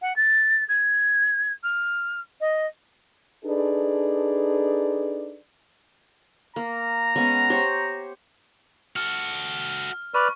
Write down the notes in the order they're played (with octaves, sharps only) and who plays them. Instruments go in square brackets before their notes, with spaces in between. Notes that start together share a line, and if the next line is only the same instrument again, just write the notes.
[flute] F#5
A6
G#6
F6
D#5
[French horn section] D4 D#4 G#4 A4 B4 D5
[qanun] A#3 [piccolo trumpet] A#5
[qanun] G#3 B3 C#4
G4 C5 C#5
[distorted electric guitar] F#4 A4 [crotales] F6
[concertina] B4 D5 F6 [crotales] C#6